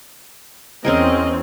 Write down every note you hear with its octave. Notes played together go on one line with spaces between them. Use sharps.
E2 C4 C#4 G#4 A#4 D#5